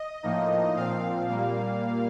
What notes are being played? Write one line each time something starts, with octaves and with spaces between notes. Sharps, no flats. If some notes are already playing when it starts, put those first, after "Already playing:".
Already playing: D#5
A2 F3 A#3 D#4
A#2 F3 C4 F5
A#2 G3 A#3